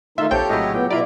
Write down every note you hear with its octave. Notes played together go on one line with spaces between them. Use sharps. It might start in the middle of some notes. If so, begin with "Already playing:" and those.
D#3 A3 D#4 F4 E5 C6
A#1 C4 G4 A4 C#5 G5 G6
A2 C#3 F#3 E4 D#5
A#2 B3 G5
B2 E4 F4 D5 A#5 B5